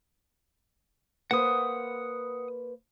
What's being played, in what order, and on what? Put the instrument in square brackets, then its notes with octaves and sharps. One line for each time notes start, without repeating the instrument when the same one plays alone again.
[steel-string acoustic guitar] A#3 B4 C5 [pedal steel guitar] F#5 D#6